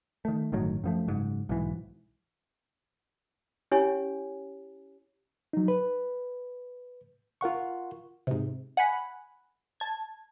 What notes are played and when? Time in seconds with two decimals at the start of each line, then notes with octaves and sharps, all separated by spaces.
0.25 D#3 A3
0.52 G1 A2 D#3 F#3
0.84 F#2 F3 A3
1.08 F#1 G#2
1.49 B1 G#2 E3
3.71 C#4 E4 G4 C#5 G#5
5.53 F#3 D#4
5.68 B4
7.41 F4 A#4 F#5 C#6
8.27 G#2 C3
8.77 F#5 G#5 B5
9.80 A5 G#6